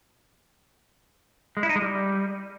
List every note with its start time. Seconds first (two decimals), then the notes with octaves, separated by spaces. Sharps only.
1.57 G#3
1.63 E4
1.69 D#4
1.76 G#3
1.82 G3